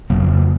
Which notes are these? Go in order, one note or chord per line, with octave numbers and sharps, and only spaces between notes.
F2 C#3 F#3 A#3